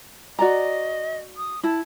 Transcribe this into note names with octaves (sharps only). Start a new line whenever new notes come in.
F#4 D5 D#5 A#5
D#6
E4 A5